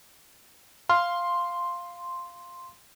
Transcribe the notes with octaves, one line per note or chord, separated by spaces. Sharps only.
F5 C6